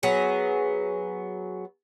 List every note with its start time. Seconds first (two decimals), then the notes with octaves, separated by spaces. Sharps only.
0.03 F#3 B3 G#4